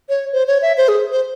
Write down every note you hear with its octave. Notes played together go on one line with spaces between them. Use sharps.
C#5
C5
C#5
E5
C5
G#4
C5